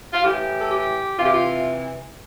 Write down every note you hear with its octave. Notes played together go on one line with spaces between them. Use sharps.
F4
A2 E3 G4
A4
G4
C3 E3 F4
G4
F4